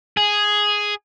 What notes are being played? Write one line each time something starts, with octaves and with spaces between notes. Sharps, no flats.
G#4